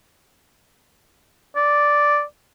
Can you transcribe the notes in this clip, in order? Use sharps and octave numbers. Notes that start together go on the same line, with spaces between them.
D5